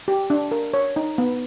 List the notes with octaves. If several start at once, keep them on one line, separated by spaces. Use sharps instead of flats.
G4
D4
A#4
C#5
D#4
B3